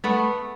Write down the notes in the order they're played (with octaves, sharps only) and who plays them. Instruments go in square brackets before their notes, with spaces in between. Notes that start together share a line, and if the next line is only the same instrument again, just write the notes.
[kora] A3 B3